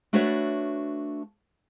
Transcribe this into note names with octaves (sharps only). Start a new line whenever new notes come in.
A3 D4 F#4 B4 C#5 E5